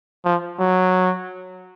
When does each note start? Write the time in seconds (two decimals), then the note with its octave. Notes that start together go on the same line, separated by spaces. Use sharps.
0.25 F3
0.60 F#3